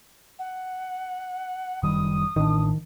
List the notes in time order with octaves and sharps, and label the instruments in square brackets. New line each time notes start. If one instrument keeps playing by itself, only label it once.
[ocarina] F#5
[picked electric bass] F#1 D#3 G3 [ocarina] D#6
[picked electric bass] A1 D4 [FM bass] D#3